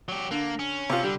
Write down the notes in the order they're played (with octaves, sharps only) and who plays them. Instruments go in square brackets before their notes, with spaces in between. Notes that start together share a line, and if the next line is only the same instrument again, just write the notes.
[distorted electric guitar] F#3 G4
[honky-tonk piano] D3 [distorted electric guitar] A#3
[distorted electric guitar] C#4
[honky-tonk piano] C3 F4
[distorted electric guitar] D3 [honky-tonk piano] G3